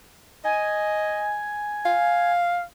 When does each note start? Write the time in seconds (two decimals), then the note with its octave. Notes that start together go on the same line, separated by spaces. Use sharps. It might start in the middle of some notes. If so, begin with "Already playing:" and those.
0.45 D#5 G#5
1.85 F5